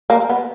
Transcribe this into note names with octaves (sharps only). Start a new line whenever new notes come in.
A#3
B3